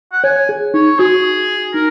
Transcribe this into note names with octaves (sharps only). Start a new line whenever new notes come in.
F#5
C#5 G#5
G#4
D#4 C#5
F#4 G#4
D#4 A#4